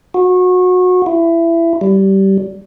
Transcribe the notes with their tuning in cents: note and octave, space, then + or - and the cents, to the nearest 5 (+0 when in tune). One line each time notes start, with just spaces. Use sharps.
F#4 -25
E4 +20
G3 -20